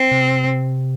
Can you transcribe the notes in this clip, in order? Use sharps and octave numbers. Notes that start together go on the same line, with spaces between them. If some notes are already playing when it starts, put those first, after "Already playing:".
Already playing: C4
C3